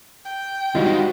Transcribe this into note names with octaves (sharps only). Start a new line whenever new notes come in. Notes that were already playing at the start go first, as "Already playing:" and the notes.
G5
D2 G#2 G3 D#4 F4 F#4